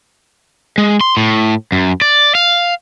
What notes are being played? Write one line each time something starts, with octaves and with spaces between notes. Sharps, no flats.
G#3
C6
A2
F#2
D5
F5